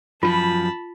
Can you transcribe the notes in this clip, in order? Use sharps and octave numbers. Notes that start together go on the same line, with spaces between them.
F#2 F3 F4 A5 B5